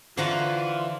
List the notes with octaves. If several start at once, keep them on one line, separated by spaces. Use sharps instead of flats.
D3 E3 F4 F#4 C5 F5 A5 A#5